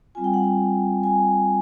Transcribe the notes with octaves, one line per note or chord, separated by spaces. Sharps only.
G3 C4 F4 G#5
G5
F#5
G5
G#5